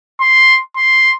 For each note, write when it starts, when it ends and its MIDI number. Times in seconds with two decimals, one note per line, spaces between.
0.21 0.59 84
0.77 1.13 84